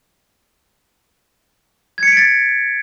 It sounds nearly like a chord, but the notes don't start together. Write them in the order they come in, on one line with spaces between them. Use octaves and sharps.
G#6 C#7 B6 D7 A6